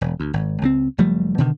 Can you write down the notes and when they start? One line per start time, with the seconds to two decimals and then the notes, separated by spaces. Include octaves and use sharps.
0.01 E1
0.20 D2
0.33 G#1
0.62 C#2 F#3 C4
0.98 F#1 F3 G3 A3
1.38 B2 D3 D#3